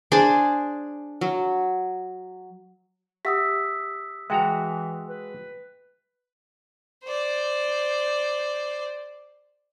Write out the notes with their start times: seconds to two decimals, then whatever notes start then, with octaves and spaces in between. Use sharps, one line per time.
0.12 D4 G#4 C5 D5
1.21 F#3
3.25 G4 E5 F#5 D#6 E6 B6
4.30 E3 G#3 F#4 E5 G5 A5 A#5
5.08 B4
7.04 C5 D5